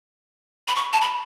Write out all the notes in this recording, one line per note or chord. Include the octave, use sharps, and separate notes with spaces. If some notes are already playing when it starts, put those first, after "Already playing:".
B5
C#6
A5
B5